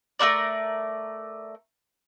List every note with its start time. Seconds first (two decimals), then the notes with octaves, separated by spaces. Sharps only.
0.19 A3 F#4 A#4 D5